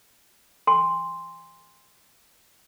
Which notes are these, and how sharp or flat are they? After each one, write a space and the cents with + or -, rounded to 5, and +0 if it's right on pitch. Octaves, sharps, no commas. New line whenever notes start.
G#5 -40 C6 -5